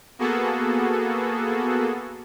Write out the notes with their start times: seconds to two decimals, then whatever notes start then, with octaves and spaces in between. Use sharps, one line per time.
0.19 A#3 B3 F#4 G#4 A4